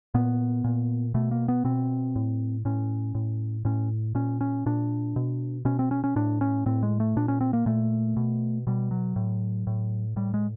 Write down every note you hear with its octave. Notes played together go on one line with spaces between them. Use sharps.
A#2 B3
A#2
B2 A3
A#3
B3
B2 C4
A2
A2 C#4
A2
A2 C#4
A#2 C#4
C#4
A#2 D4
B2
B2 C#4
C4
C#4
C#4
A2 D4
C#4
A2 C4
G#3
A3
A#2 D4
C#4
C4
A#3
A#2 A3
B2
B2 G3
F#3
A2
A2
A2 G3
G#3